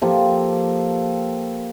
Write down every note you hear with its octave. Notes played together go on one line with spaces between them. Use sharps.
F3 A#3 G4 A4